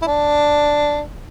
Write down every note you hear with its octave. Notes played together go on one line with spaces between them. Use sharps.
E4
D4